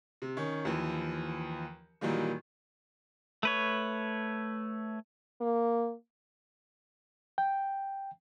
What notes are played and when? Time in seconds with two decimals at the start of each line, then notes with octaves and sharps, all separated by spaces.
0.22 C3
0.37 D#3 C#4
0.65 D#2 E3 F3
2.01 A#2 D#3 E3 F#3 G3 A#3
3.43 A3 B4 C#5
5.41 A#3
7.38 G5